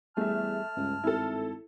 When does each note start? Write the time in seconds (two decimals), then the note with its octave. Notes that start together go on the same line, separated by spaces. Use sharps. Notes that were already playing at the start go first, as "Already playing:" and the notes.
0.17 E2 G3 A3 G#4 E5 A5 F6
0.77 C#2 G2
1.04 G#1 E4 A4